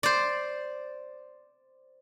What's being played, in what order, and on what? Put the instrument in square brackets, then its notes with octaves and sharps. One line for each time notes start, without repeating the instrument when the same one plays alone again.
[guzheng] C5 D5